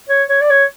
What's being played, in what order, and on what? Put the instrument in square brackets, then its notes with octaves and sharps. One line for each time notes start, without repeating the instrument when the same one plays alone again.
[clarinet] C#5
C#5
D5
C#5